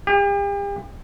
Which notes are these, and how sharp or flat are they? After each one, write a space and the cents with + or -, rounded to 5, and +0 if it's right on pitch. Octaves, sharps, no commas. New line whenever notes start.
G4 +40